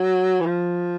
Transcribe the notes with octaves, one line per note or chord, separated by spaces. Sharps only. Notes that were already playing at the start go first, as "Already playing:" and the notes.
Already playing: F#3
E3
F3